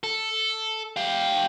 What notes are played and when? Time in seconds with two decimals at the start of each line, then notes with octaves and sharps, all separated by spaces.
0.03 A4
0.97 G4 F5